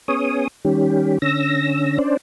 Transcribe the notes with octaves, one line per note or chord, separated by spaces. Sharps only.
B3 C#4 G#4 C#5 D#6
D#3 G3 C#4 G4
D3 C#4 E6 A#6
C#4 D4 C5 D5